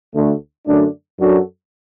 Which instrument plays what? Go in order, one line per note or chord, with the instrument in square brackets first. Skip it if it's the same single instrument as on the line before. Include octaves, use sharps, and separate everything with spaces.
[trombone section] D2 D3 A3
F#2 D3 A3 D4
F#2 F#3 D4 F#4 A4